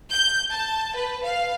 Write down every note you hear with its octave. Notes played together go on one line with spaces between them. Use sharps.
G6
A5
B4
F5